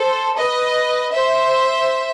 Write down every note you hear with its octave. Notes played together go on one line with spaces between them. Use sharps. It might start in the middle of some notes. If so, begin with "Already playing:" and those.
Already playing: A4 C5
B4 D#5
C5 E5